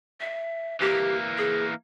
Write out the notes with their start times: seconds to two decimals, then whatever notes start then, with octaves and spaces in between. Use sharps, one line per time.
0.20 E5
0.81 E3 A#3 G4
1.38 G#4